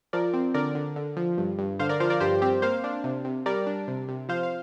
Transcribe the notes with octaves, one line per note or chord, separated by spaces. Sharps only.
F3 A#4 D5
C4
D3 A#4 D5
D3
D3
F3
G2
G2
D3 C5 F5
A#4 D5
F3 C5 F5
A#4 D5
G2 G4 C5
C4 G4
A#3 C5 F5
D4
C3
C3
G3 A#4 D5
D4
C3
C3
F3 C5 F5
F5